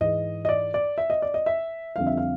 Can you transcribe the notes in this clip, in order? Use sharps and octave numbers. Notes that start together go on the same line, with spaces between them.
G#2 E3 G#3 D#5
D#5
D5
D5
E5
D#5
D5
D#5
E5
F2 D3 G3 C4 F5
E5
F5